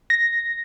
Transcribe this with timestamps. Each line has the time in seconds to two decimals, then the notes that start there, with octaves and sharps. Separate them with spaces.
0.10 A#6